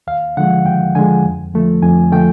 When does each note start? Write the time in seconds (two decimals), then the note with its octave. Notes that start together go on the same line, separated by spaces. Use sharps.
0.07 D#2 F5
0.37 D3 F3 G#3 F#5
0.66 D#2 G5
0.95 D3 F3 G#3 G#5
1.24 F2
1.54 D3 F3 A3
1.82 F2 G#5
2.12 D3 F3 A3 G5